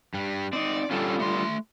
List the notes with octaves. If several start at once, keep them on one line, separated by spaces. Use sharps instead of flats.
G2 G3
C4 D#4 D5
D3 G3 C#4 F4 A4
A3 C6